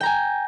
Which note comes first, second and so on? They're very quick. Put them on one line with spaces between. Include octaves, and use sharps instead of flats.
G5 A#5 G#5